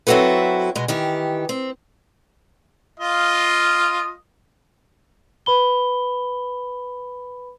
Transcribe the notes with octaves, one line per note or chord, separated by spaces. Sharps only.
F#3 C4 E4 F#4 A4 B4
B2 G#3
D#3 E3 G4
C4
F4 D#5 F5
B4 B5 G7